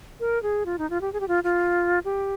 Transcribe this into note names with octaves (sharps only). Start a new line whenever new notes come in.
A#4
G#4
F4
D#4
F4
G4
G#4
G4
F4
F4
G4